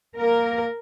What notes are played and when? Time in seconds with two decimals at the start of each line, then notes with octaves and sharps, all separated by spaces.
0.18 A#3 A#4